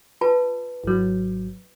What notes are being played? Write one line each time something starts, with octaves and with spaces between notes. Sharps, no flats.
F4 B4 A5
G#1 F#3